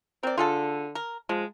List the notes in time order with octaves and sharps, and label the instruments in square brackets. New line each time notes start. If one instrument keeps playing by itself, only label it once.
[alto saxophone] C4 [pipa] A#4 D5
[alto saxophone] D3 [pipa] F4 G#4 A4
[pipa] A#4
[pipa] F3 [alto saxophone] G#3